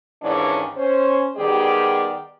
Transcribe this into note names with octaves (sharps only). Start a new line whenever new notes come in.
D#2 G#2 E3 C#4 D4 D5
C#4 C5
D#3 G3 B3 G4 G#4 D5